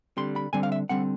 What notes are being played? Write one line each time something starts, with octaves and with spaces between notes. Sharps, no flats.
D3 G3 C4 C6
B5
D3 G3 C4 G#5
F5
E5
D3 G3 C4 F#5